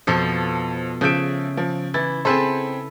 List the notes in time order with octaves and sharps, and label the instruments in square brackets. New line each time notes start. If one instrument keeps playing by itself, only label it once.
[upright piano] F2 [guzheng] B2 F3 A4
[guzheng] C#3 E5 [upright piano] F3 G6 D7
[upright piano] F3
[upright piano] E3 A6 [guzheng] E4
[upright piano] C4 G#4 C5 [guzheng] A4 B4 A5